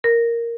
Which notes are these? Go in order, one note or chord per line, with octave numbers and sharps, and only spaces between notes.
A#4